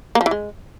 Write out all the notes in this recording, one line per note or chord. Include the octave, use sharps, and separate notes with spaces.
A#3
F3
E3
G#3